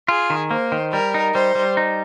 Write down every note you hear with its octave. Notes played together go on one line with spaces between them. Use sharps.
F4 G#4
D#3
A#3 C5
D#3
G3 A#4
D#4
G3 C5
G3
D#4